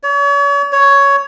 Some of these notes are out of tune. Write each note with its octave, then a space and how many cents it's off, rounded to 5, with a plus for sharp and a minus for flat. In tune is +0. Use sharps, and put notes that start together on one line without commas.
C#5 +40
C#5 +10